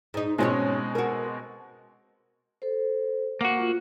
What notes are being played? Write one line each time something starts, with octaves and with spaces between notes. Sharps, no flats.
G#2 D#4
G#2 B2 G#3 C4 C#4 C#5
F#4 A#4
A4 C5
A#3 F#4 F#5
F4